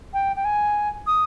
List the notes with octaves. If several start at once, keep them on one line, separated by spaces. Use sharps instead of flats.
G5
G5
G#5
D#6